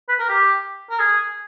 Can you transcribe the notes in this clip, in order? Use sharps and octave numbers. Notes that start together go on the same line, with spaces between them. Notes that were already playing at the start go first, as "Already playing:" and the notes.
B4
A#4
G4
A#4
G#4